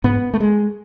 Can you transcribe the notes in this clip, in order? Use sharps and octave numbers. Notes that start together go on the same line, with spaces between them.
G#2 B3
A3
G#3